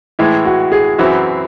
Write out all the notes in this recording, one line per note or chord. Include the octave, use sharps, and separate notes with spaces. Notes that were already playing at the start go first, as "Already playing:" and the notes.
A2 E3 G#3 E4
F#4
G#4
F#2 E3 C4 E4 F#4